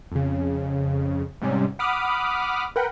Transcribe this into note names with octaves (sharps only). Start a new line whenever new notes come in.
F2 C#3
G#2 C3 G3 C#4
F#5 B5 D6 D#6 F6
A#4 B4 F#5 G5